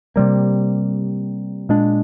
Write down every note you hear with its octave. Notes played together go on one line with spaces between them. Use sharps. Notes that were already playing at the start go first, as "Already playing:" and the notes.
C3 G3 A#3
A#2 G#3 D4